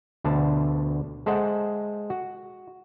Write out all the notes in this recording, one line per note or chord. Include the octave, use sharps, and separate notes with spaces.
D2 B2 D3 A5
G#3 A4 C5 D#5 E5 F#5
F#4